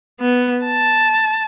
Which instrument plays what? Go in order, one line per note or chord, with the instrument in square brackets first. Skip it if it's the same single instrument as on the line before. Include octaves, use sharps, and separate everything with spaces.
[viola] B3
A5